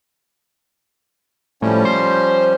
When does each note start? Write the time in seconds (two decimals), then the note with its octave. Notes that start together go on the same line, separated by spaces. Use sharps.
1.62 A2 F3 G3 C#4
1.85 C5